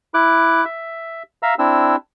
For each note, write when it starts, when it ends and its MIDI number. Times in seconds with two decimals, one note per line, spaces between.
0.14 0.65 64
0.14 0.65 86
0.14 0.65 90
0.65 1.23 76
1.43 1.54 76
1.43 1.54 77
1.43 1.54 82
1.43 1.54 88
1.59 1.96 60
1.59 1.96 62
1.59 1.96 64
1.59 1.96 88